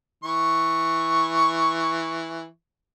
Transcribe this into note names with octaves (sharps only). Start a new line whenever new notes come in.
E3 C#6